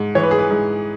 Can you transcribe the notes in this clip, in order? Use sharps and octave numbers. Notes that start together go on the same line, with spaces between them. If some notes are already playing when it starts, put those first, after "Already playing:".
Already playing: G#2
E3 C#5
B4
G#4
B4
G#2